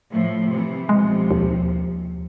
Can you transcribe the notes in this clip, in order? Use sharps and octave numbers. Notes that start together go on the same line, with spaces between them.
A2 F3
C3 E3 F3
B1 C3 F3 G#3
D#2